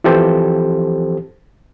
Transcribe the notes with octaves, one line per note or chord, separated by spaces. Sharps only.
E3 F3 C4 G4 A4 C5